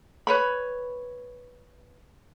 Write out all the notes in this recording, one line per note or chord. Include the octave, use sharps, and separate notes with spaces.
B4 C#5 B5